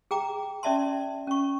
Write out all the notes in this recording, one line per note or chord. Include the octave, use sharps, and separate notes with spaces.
G#4 G5 A#5 D6
C#4 D5 E5 A5 C6
C#4 C#6